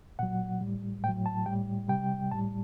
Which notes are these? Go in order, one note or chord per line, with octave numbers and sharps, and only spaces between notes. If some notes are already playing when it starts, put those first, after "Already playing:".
A#2 F#3 F#5
A2 G3
A2 F#3 G5
A5
A2 G3 G5
C3 G3 G5
A2 G3 A5